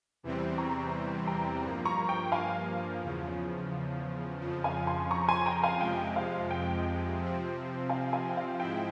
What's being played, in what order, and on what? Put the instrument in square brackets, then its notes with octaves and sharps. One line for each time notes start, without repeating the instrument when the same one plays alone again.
[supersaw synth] E2 C3 E3 G3 C4
[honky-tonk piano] A#5 C#6
G5 A#5
[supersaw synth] G2 F3 A#3
[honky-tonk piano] A#5 C#6
G5
F5 G#5
[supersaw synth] E2 C#3 F3
F2 C#3 F3
[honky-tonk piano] F5 G#5
G#5 C6
A#5 C#6
G#5 C6
G5 A#5
F5 G#5
[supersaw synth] F2 C3 F3 G#3 [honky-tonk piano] G5
[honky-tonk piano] F5
G5
[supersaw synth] C3 F3 C4
[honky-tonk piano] F5 G#5
F5 G#5
G5
F5
[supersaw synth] G#2 F3 G#3 E4 [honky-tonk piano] G5